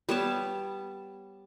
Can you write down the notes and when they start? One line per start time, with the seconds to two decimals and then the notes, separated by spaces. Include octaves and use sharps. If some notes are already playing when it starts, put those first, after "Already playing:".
0.09 G3 B3 C#5 A5